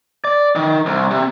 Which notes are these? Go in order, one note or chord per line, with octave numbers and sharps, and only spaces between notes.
D5
D#3
C2
C3